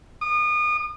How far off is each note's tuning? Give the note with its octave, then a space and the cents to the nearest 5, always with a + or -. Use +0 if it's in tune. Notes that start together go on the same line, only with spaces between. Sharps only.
D#6 -35